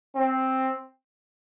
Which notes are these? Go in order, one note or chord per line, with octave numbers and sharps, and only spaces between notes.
C4